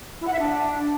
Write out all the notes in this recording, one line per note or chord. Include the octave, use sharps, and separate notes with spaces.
E4
F#5
E5
D4